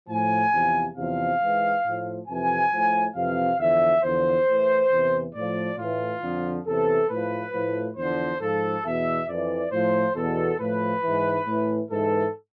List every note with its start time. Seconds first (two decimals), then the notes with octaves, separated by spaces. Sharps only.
0.09 A2 F3 G#5
0.54 E2 C3 F3
0.97 E2 C3 F3 F5
1.41 G#2 E3
1.84 A2 F3
2.28 F2 C3 E3 G#5
2.72 A2 F3
3.15 F2 C3 E3 F5
3.59 E2 D3 F3 E5
4.03 E2 D3 F3 C5
4.48 A2 E3
4.91 E2 C3 E3
5.34 A2 F3 D5
5.78 A2 E3 F4
6.22 F2 D3 F3
6.66 E2 C3 E3 A4
7.09 A2 F3 B4
7.53 A2 F3
7.97 E2 D3 F3 C5
8.41 G#2 F3 A4
8.84 E2 B2 E5
9.28 F2 E3 D5
9.71 A2 F3 C5
10.16 E2 B2 A4
10.59 A2 F3 B4
11.03 G#2 E3
11.46 A2 E3
11.90 G#2 E3 A4